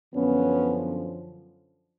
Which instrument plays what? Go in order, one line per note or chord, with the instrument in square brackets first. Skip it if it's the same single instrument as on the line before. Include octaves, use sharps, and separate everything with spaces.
[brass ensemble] F#2 D3 F3 B3 C#4